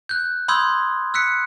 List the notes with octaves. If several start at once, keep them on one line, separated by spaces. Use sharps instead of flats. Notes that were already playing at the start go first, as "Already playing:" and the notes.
F#6 G6
B5 C6 D#6 E6 G6 G#6
E6 F#6 B6 C#7